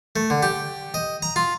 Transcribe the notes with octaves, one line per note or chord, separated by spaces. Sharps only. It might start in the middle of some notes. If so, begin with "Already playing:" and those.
A3
D3
G4
D#5
A#5
F4